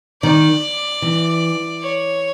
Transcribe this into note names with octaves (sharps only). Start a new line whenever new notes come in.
D#3 D5
E3
C#5